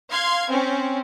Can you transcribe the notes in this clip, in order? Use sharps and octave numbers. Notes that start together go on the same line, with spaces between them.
F5 C6 G#6
C4 C#4